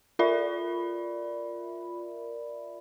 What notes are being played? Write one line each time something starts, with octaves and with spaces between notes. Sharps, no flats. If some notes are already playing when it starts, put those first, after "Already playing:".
F4 A#4 D5 E5 B5